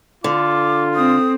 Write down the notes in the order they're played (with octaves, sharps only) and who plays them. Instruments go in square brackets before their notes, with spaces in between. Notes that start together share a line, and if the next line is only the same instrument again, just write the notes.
[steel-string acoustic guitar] D3 [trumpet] F4 [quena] D6
[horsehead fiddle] C4 [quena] D#6